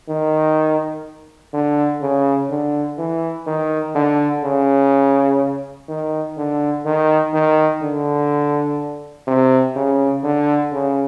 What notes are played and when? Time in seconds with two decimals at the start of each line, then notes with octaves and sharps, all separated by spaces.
0.09 D#3
1.54 D3
2.02 C#3
2.50 D3
2.98 E3
3.47 D#3
3.95 D3
4.44 C#3
5.89 D#3
6.37 D3
6.85 D#3
7.34 D#3
7.82 D3
9.27 C3
9.76 C#3
10.24 D3
10.72 C#3